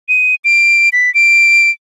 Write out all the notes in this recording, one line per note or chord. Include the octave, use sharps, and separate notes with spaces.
D#7
D7
B6
D7